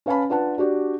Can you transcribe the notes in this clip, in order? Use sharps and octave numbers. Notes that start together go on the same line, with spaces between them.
C#4 B4 F5 G#5 A5 B5
D4 F4 B4 F#5 A5
D4 F#4 G4 D5